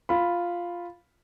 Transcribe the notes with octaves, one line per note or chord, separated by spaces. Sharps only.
F4 B5